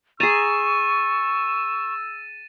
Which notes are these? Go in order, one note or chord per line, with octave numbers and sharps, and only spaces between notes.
G#4 A#5 C#6 E6 A6 D#7 E7